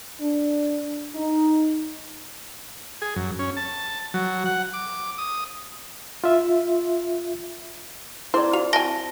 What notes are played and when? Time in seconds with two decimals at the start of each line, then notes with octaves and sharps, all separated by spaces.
0.20 D4
1.15 D#4
3.02 G#4
3.16 F#2
3.39 C#4
3.57 A5
4.14 F#3
4.45 F#5
4.74 D6
5.18 D#6
6.24 F4 E5
8.34 C4 E4 G#4 C5 D5
8.53 F4 F#4 F7
8.73 F#3 C4 G#5 A5 A#6 G7